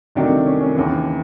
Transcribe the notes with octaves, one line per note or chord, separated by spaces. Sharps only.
C2 C3 D#3 F#3 A3 D4
C#4
C#4
D#2 C#3 E3